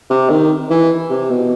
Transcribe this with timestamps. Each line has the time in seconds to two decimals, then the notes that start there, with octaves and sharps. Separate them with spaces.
0.10 C3
0.30 D#3
0.70 E3
1.10 C3
1.30 B2